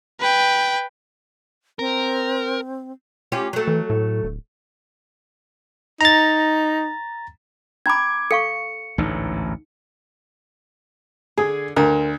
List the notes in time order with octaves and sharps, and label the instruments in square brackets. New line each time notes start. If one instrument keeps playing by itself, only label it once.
[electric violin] B4 G5
[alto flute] C4 [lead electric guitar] A#4
[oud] C#4 F4 G4
F#3 A3
[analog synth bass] E3
A2
D1
[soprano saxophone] D#4 [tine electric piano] A#5 A6
[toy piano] C#4 A#5 B5 [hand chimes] D6 G#6
[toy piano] A4 F5 C#6 [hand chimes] C#7
[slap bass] A1 D2 G#2 [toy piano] D#4
[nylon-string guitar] D3 [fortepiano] G#4
[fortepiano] D2 [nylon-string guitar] A#4